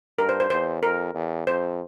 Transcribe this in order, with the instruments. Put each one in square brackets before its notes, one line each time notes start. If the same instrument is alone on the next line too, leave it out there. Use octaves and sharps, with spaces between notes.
[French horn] G2 [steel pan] A#4
[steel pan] C5
C5
[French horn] E2 [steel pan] C5
[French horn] F2 [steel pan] A#4
[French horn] E2
[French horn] F2 [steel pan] C5